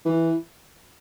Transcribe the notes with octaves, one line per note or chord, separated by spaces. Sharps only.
E3